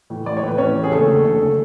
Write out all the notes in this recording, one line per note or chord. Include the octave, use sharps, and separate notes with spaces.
A2 E3
A1 D5
C#5
A2 E3 B4
A1 C#4 C#5
A2 E3
G#4
F#1 A3 A4
E2 D3
F#1
D3